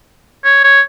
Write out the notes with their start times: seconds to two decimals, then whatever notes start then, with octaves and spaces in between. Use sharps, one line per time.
0.45 C#5
0.64 C#5